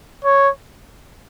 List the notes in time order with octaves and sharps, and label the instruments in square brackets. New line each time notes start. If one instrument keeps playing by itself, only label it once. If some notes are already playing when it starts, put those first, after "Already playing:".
[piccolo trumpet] C#5